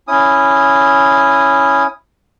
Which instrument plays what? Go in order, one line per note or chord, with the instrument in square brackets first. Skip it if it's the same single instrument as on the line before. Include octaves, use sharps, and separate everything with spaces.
[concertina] C#4 E4 D#6